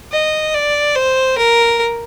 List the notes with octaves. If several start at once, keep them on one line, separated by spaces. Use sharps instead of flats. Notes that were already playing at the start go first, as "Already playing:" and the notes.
D#5
D5
C5
A#4